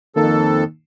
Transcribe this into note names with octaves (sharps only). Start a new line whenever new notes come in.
F2 D#3 A#3 D#4 A4